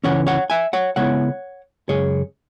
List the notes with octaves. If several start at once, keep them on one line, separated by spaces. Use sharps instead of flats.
C#2 C#3 E3 C#4 C#5 F#5
C#5 F#5
E5 G#5
C#5 F#5
C#3 G#3 B3 E4 C#5 F#5
F#2 C#3 G#3 G#4 C#5